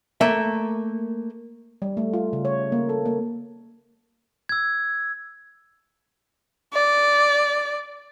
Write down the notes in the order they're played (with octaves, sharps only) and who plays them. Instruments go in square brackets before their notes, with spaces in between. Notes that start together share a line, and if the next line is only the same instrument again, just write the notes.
[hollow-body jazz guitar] A3 A#3 E5
[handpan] G3
A3
F4
C#3
C#5
A#3
A4
A#3
[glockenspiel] E6 G#6
[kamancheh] D5